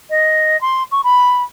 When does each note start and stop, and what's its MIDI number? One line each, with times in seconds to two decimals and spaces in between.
0.10 0.59 75
0.61 0.83 84
0.91 1.01 85
1.04 1.42 83